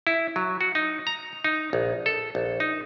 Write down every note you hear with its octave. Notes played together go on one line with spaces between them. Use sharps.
E4
F#3
F#4
D#4
A#5
D#4
A#1
A4
A#1
D#4